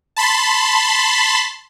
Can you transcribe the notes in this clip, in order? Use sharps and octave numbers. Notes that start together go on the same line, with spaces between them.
A5 B5 C6